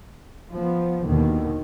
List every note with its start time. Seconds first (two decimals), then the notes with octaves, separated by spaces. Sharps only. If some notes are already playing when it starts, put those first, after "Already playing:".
0.53 F3 B3
1.06 D#2 B2 D3 D#3